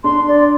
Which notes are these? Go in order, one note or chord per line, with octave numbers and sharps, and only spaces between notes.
D4 C6
D5